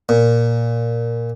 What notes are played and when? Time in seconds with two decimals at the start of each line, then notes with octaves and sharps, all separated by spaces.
0.09 A#2